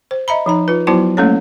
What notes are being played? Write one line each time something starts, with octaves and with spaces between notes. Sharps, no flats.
C5
D#5 E5 A#5 B5
F3 D#4 A#5
F4 B4
F#3 B3 E4 F#4 C5 A5
G3 A3 A#3 C#4 A4 C#5